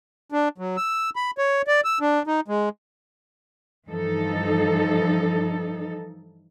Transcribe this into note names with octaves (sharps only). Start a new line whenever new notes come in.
D4
F#3
E6
B5
C#5
D5
E6
D4
D#4
G#3
G2 E3 F3 D#4 A4